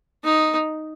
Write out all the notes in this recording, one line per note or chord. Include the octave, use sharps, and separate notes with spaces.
D#4